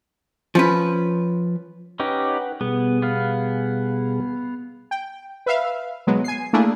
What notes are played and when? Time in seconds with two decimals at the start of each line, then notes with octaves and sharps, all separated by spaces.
0.55 F3 C#4 B4
2.00 C#4 D#4 G4 B4 F#5
2.61 B2 G3 B3 G#4
3.02 B3 F5
4.91 G5
5.46 B4 E5 F5
6.07 B2 F#3 G#3 B3
6.24 G#5 C7
6.53 A3 A#3 D4 E4 G#4